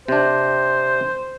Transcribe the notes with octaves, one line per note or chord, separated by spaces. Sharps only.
C3 D4 C5